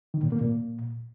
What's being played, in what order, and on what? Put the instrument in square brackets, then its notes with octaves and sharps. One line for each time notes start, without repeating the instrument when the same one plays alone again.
[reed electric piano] D#3
A#2
A#3
A#2